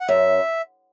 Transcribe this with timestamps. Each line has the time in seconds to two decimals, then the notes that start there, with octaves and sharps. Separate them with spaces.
0.01 F#5
0.08 F#2 E5